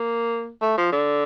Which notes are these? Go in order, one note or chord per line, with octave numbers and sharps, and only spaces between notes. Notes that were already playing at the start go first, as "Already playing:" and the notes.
Already playing: A#3
A3
F3
D3